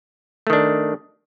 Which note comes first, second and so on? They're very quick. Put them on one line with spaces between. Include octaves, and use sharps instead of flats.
A3 D#3 D4